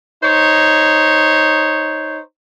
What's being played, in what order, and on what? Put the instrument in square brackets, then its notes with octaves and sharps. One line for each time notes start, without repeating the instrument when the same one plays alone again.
[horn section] D#4 C5 C#5